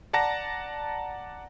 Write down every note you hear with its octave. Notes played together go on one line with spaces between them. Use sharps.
D5 F#5 A5 A#5 A#6